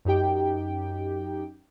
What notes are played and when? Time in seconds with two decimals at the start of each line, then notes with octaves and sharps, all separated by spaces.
0.05 F#2 D#4 G4 G5